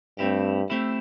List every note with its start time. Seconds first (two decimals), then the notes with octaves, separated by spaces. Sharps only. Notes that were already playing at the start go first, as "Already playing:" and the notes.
0.18 G2 A3 C4 E4 G4
0.70 A3 C4 E4 G4